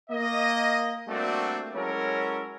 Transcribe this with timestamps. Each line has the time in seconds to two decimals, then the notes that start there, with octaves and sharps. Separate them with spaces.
0.10 A#3 D#5
1.08 G3 A3 A#3 C4 D4 F#4
1.75 F#3 G#3 C#4 E4 A4 A#4